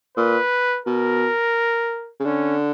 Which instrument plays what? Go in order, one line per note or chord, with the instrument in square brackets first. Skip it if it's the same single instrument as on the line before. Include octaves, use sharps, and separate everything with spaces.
[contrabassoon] A#2 [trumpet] B4
[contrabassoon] B2 [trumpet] A#4
[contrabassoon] C#3
[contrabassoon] D3 [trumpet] C#4